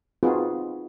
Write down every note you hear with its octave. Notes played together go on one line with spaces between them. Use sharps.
C4 D#4 F4 F#4 G#4 B4